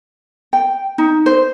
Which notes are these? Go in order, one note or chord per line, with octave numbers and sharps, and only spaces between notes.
G5
D#4
C5